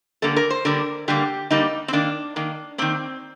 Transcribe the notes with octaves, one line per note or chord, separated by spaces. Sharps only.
D3 G3 A#3 A4
A#4
C5
D3 G3 A#3 A#4
D3 G3 A#3 G4
D3 G3 A#3 D#4
C4
D#3 A#3 D4
D#3 A#3
D#3 A#3 C4